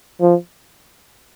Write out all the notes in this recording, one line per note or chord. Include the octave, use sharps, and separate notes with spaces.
F3